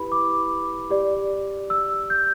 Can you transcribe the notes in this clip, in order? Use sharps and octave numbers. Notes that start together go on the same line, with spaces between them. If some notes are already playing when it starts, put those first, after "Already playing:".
Already playing: E4 G4 B4 B5
D6
G4 D5
E6
G6